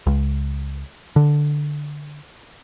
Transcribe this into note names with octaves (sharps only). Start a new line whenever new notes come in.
C#2
D3